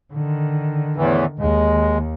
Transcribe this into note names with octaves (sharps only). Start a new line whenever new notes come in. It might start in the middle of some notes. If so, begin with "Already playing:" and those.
D3 D#3
E2 A2 E3
D#2 G#3